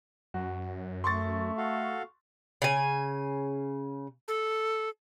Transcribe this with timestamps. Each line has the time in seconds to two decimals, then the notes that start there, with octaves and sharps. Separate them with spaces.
0.34 F#2 F#4
1.04 A3 C6 C#6 A6
1.57 F#4 A4 F5
2.62 C#3 G#5
4.28 A4